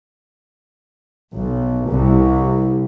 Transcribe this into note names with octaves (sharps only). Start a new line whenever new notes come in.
B1
C2